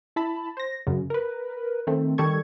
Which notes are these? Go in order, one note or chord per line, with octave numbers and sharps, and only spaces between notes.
E4 A5 B5
C5 A#6
F#2 C#3
A#4 B4
D#3 A3 C4
D#3 G3 A4 C#6 G#6